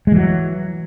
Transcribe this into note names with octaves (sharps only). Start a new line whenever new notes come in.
E3 F#3 G#3